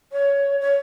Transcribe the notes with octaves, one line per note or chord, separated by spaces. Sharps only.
C#5
C#5